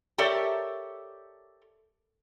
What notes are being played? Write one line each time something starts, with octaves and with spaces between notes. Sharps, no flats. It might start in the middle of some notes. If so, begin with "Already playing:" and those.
G4 A4 A#4 C#5 D5 E5